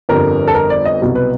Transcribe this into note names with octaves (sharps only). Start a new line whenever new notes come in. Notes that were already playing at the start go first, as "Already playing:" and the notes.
G1 F2 D3 G3 A#4
A4
A#4
D5
D#5
C2 B2 F#3
B4